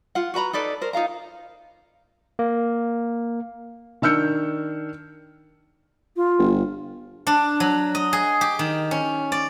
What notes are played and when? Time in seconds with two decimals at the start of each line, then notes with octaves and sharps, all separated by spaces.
0.15 F4 F#5
0.34 F#4 B4 A#5 B5
0.53 D#4 A4 B4 D5
0.81 A#4 C5
0.93 D#4 F4 F5 A#5
2.39 A#3
4.02 D#3 D4 E6 F6 G6 C#7
6.16 F4
6.39 G1
7.27 D4
7.60 F#3
7.95 D#5
8.13 G#4
8.41 G4
8.59 D#3
8.91 C#4
9.32 D5